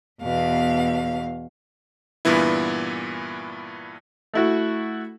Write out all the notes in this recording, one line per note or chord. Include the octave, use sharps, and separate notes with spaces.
E2 B2 F5
G2 A#2 E3 B3 E4
A3 E4 F#4